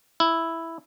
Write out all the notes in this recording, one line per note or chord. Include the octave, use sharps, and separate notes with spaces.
E4